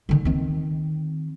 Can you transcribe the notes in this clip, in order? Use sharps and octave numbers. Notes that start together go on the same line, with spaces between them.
D3 D#3
D#3 C4